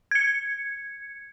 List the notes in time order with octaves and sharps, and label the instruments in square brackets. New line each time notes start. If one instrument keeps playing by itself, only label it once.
[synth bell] G#6 C#7